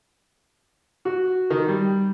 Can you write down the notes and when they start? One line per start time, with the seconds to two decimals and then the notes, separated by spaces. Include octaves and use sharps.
1.05 F#4
1.50 D#3
1.68 G3